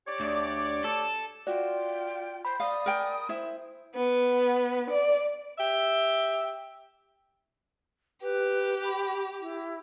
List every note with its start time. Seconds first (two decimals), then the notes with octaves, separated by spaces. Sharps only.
0.07 G4 C#5 D5
0.20 D2
0.84 A4
1.47 F4 F#4 D5 G5
2.45 C5 B5
2.60 D5 F5 D#6
2.86 A#4 G5 G#5
3.29 E4 C5 E5
3.95 B3
4.89 D5
5.58 G4 E5
8.22 G4 B4
8.84 B5
9.41 E4